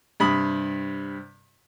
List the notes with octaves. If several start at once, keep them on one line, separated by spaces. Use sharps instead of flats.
G2 C3 B5 D#6